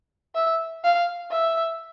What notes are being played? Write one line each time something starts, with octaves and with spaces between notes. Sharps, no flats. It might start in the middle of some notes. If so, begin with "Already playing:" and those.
E5
F5
E5